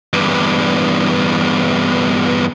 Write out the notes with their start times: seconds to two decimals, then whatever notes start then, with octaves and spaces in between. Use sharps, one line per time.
0.13 E2 G2